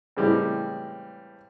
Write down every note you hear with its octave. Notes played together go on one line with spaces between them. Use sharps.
A2 C#3 E3 G3 G#3 C4